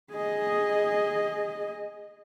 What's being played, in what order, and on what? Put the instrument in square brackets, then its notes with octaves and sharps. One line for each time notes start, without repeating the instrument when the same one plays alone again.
[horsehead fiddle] G#4 D#5